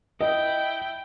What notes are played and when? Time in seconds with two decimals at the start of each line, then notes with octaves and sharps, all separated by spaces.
0.21 E4 D#5 G5